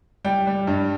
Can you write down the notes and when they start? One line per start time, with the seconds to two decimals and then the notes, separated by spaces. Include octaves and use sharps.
0.25 G3 G5
0.47 G3
0.67 G2